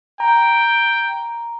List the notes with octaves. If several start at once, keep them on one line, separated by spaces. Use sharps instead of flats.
G5 A#5